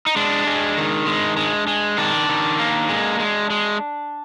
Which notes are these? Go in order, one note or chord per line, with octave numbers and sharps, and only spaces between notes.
D#4
G#3 D4
G#3
D#3
G#3
G#3
G#3
D#3 D4
D#3
A#3
G#3
G#3
G#3